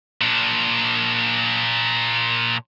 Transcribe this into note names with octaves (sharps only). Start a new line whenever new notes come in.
A#2 D4